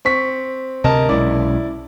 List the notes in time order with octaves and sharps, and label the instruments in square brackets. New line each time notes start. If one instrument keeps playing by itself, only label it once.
[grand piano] C4 C#6 B6
[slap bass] D2 C3 [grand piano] A#4 D#5 A5
[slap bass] B1 G#3 C#4 [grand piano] E4 D5